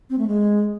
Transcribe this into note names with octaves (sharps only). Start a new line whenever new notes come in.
C4
A3
G#3